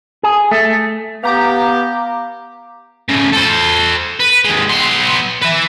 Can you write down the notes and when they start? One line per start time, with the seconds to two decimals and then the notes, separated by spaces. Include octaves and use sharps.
0.23 G#4
0.51 A3
1.24 B3 G4 F5 A#5 D6
3.09 A2 C#3
3.32 A4 C5
4.20 B4
4.45 D#2 G#3
4.69 B3 C6
5.42 B4 E5